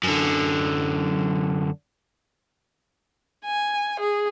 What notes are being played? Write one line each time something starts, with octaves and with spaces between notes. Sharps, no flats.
F#2 D3
G#5
G#4